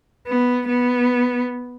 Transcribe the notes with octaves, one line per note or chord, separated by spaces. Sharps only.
B3
B3